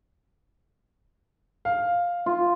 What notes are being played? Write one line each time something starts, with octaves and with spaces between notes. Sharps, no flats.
F5
F4